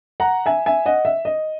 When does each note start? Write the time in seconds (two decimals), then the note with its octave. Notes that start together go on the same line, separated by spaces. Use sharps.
0.20 F#5 A#5
0.46 E5 G#5
0.66 E5 G#5
0.86 D#5 F#5
1.05 E5
1.25 D#5